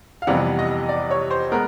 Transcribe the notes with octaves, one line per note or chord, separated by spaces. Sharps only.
F5
F2 C3 E3 G3 B3 F#5
D#5
D5
C#5
C5
G#3 B3 A#4